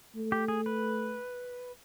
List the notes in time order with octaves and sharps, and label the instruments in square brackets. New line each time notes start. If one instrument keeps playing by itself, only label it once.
[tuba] A3
[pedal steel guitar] G4
G#4
B4